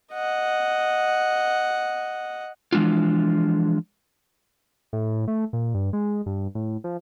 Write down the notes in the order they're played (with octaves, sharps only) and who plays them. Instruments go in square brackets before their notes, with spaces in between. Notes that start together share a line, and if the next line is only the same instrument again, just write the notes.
[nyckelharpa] D#5 F#5
[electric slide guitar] E3 F3 G#3 D4 F4
[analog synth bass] A2
A3
A#2
G2
G#3
G2
A2
F3